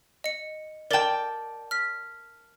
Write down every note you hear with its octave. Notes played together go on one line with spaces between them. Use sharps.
D#5 C#7
A#4 D5 G5 A5
F6 B6